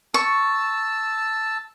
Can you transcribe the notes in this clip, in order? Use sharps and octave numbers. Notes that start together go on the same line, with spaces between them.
A5 C#6 E6